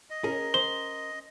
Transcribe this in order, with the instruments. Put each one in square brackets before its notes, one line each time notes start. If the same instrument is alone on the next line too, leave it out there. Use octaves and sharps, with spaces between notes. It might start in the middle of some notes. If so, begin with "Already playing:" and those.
[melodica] D#5
[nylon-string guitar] C#4 A#4 [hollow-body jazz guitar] G#4
[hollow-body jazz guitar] C5 [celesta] G7